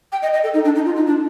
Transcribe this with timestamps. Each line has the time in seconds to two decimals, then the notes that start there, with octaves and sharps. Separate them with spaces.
0.12 G5
0.22 D#5
0.33 D#5
0.44 A4
0.54 D#4
0.65 D4
0.75 D#4
0.86 F4
0.96 D#4
1.07 D4